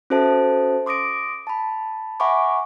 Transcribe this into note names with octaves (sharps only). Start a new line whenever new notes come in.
C#4 F#4 A4 C5 E5 A5
C6 D6 D#6 A#6 D7
A5 B5
E5 F#5 G#5 B5 C#6 D6